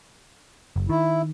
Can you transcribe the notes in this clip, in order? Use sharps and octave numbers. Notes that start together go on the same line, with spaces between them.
F#1
D#3 E4